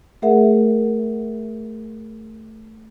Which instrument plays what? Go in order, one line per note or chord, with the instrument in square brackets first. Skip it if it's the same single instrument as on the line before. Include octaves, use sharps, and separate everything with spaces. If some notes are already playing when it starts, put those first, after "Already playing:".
[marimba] A3 G#4 A#4 E5 F#5